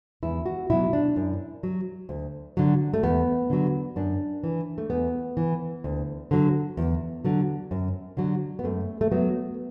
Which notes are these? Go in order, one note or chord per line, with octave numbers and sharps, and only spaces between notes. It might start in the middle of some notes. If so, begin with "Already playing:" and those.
E2 E4
F#4
B2 F#3 E4
D4
F#2
F#3
D2
D3 F#3
A3
E2 B3
D3 F#3
F#2 D4
E3
A3
E2 B3
E3
D2
D3 F#3
E2
D3 F#3
F#2
D3 F#3
B3
F#2 A3
A3
F#3 B3